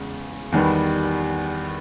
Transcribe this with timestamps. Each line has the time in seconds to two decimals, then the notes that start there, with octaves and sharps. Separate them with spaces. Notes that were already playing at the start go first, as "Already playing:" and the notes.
Already playing: E2 C#3 G#3
0.52 E2 D#3 G3 B3